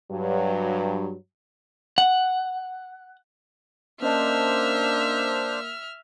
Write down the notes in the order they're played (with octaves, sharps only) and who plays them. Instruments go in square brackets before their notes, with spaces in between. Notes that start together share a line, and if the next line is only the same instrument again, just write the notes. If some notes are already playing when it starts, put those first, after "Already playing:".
[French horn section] G2 F#3
[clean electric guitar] F#5
[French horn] A#3 [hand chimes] C#4 D#5 A5 [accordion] D4 C5 [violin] E5 F6